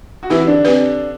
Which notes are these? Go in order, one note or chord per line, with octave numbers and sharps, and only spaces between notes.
F#4
E3 C4 E4 G4 B4
D3 D4
C4 G4 B4